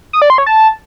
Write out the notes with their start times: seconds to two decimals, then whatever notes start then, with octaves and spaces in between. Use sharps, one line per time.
0.13 D#6
0.22 D5
0.30 C6
0.38 C#5
0.46 A5